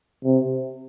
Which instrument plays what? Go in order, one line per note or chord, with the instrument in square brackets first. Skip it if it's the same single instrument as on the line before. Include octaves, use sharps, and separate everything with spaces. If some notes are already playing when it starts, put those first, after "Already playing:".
[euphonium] C3